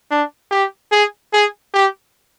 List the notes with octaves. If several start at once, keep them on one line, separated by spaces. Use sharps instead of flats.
D4
G4
G#4
G#4
G4